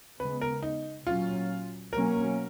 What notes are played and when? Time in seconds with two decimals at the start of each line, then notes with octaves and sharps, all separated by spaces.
0.19 C#3 G#3 B3 B4
0.41 A#4
0.63 D#4
1.06 A#2 F#3 C#4 F4
1.93 B2 F#3 A#3 C#4 A#4